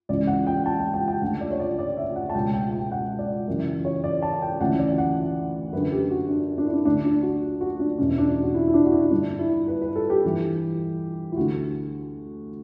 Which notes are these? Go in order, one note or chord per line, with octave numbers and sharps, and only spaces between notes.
C#2 C#3 E3 D5
F#5
G5
A5
G5
G5
G5
D2 D3 F#5
D5
C#5
D5
D5
E5
F#5
A5
C#2 B2 G5
G5
G5
F#5
D5
F#2 C#3 E3
C#5
D5
A5
G5
D2 C#3 E3 F#5
D5
F#5
F#2 D3 B4
G4
F#4
D4
D4
E4
D4
D2 D3 D4
D4
F#4
F#4
D4
E2 B2 C#4
D4
F#4
E4
E4
D4
F#4
E4
G2 D3 D4
E4
B4
B4
A4
G4
G2 E3
E4
D2 D3 F#4